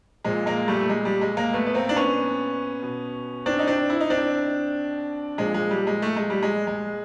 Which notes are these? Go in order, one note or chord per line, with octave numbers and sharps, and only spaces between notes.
A#2 F3 G#3
G#3 A#3
G3 A3
A3
G#3
G3
G#3
G#3 A#3
A3 B3
B3
A#3 C4
D4
B3 C#4
B2
C4 D4
D#4
C4 D4
E4
D#4
C4 D4
A#2 F3 G#3
G#3
G3
G#3
A3
G#3
G3
G#3
G#3